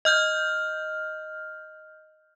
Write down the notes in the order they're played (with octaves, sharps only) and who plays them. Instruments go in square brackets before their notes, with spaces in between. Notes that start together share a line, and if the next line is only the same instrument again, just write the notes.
[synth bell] D#5 F6 G6